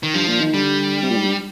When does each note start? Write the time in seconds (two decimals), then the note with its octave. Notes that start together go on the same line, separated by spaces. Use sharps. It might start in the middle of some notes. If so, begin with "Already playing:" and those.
0.03 D#3
0.14 G2 F3
0.28 A#2
0.40 D#3
0.54 D3 G3
1.02 C3
1.10 A#2
1.17 G#2
1.24 G2